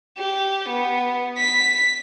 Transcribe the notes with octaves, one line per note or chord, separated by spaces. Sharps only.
G4
B3
B6